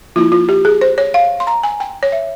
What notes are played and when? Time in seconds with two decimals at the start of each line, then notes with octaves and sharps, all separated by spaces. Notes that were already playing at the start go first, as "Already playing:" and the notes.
0.16 F3 A#3 E4 F4
0.32 F4
0.49 G4
0.65 G#4
0.81 C5
0.98 C#5
1.14 F5
1.40 C6
1.47 A#5
1.63 G#5
1.80 G5
2.03 C#5
2.12 E5